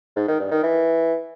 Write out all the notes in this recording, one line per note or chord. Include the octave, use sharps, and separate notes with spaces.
G#2
D#3
G2
D#3
E3